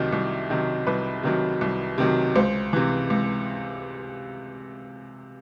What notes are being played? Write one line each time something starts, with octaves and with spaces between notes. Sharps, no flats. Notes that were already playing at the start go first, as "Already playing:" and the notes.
Already playing: C2 C3 D#3 F#3
C2
C3 D#3 F#3
C2 B4
C3 D#3 F#3
C2
C3 D#3 F#3
C#2 C5
C3 E3
C#2